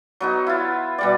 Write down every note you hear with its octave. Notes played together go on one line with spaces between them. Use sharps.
F#3 B3 D#4
E4 F4
B2 G3 D5